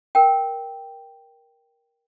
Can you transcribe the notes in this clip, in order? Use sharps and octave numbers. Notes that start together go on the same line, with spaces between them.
A#4 G5